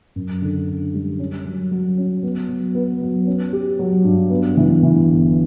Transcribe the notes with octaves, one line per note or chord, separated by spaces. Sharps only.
F#2
D3
D3
G3
C#4
F#3
F#3
C#4
B3
F#3
B3
F#3
C#4
G4
F#3
G2
B3
E3
E3
G1